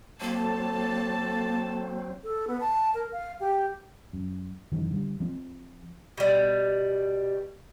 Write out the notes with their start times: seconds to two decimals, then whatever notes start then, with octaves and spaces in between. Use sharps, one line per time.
0.21 F#3 A#3 C4 A4 A5
2.24 A4
2.48 B3
2.60 A5
2.94 A#4
3.12 F5
3.40 G4
4.13 F#2
4.72 F#2 D#3 E3
4.91 D3 G3
5.20 F3 C4
6.18 B2 G3